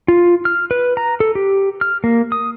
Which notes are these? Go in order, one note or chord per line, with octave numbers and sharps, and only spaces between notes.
F4
F6
B4
A#5
A4
G4
F6
A#3
D#6